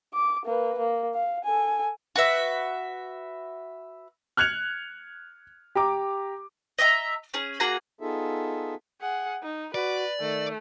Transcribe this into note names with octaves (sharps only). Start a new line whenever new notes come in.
D6
A#3 B4
A#3
F5
A4 G#5
F#4 B4 E5
F6 F#6 G#6 C#7 F7
G4 A#5 D6
D#5 E5 G5 A#5
C#4 G#4
A#3 F#4 G#4 A#5
B3 D#4 F4 G#4 A4 E5
G#4 F#5
D#4
F#4 B4 D5
D#3 A3